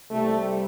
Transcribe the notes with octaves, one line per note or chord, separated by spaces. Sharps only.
C2 C3 G3 A3